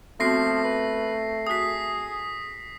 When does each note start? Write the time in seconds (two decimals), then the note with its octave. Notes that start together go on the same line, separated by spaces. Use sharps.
0.20 F3 A3 B3 C4 F#4 A#6 C7
0.64 B4
1.47 F#4 G#4 A4 D#6 B6